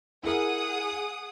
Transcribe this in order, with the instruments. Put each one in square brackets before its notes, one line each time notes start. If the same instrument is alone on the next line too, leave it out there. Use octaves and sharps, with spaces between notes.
[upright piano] E4 A#4 [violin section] G#4 F#5 D#6